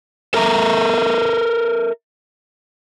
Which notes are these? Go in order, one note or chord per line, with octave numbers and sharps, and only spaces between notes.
A4 A#4 E5 A#5